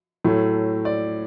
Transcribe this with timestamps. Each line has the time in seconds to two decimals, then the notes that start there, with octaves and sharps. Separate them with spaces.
0.24 A2 F#3 A3
0.85 D5